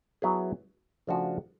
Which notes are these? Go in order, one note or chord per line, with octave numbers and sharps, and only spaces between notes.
F#3 B3 E4 G#4
C#3 F3 A3 D4 F#4